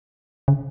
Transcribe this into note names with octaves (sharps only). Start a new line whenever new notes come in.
C#3